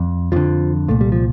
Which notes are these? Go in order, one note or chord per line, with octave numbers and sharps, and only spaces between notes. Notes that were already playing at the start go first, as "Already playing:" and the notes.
Already playing: F2
F2 D3 F3
C2 A#2 A3
G3
F3